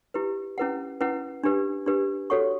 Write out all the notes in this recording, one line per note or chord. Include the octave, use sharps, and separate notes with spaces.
E4 G4 B4
C#4 E4 B4 F#5
C#4 E4 B4 F#5
D4 G4 B4
D4 G4 B4
F#4 A4 C#5 F#5 C#6